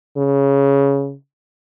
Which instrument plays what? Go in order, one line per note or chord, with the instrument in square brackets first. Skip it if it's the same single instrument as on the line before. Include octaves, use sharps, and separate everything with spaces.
[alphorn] C#3